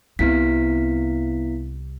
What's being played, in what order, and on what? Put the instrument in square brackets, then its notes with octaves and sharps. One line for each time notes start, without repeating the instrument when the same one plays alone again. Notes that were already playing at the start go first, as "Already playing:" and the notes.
[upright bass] C2 C3 [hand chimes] B3 E4 B6